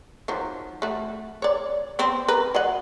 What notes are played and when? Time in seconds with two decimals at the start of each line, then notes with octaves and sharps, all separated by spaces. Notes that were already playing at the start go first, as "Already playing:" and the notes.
0.28 D#3 F3 F#3
0.82 A3 F#4
1.42 C#5 D5
1.99 B3 C4
2.28 A#4 B4
2.55 F#3 D#5 F#5